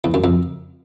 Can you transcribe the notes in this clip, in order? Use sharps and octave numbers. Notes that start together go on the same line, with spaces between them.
E2
F#2
F2